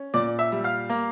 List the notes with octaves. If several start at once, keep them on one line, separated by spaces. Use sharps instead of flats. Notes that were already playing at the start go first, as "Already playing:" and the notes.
Already playing: C#4
A#2 D5 D6
E5 E6
G3
F5 F6
A#3